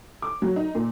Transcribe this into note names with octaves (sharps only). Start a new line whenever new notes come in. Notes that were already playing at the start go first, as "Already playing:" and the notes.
D6
F#3
D#4
A#2